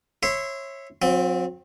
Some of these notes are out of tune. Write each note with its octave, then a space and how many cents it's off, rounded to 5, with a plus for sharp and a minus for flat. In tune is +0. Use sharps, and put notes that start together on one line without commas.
C#5 -25 E5 +0 C6 -25
F#3 -45 C4 +0